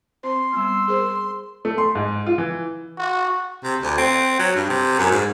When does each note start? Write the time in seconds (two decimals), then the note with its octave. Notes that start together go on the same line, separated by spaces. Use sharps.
0.23 C4 C5 C6
0.53 G3 B3 E6
0.88 G#4 A#4 C5
1.65 A3
1.78 C6
1.95 G#2
2.26 F4
2.38 E3
2.98 F#4
3.64 C3
3.83 D2
3.98 C4
4.39 F#3
4.55 G2
4.69 C3
4.99 F#2
5.11 G#2